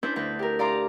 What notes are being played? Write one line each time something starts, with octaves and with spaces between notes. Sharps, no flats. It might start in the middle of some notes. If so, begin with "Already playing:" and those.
C#4 D4 E4 B4 C5 G6
D2 B4 G6
G4 A#4
D5 F5 A#5 C6 D6